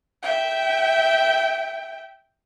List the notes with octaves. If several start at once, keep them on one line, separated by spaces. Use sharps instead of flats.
E5 G5